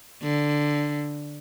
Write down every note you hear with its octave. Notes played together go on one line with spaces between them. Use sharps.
D3